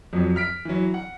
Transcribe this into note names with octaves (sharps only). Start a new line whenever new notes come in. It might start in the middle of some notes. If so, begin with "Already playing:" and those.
F2 F#3
F6 B6 D7
E3 F#3
F#5